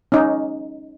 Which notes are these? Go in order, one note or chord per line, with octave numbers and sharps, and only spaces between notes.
C#4 D#4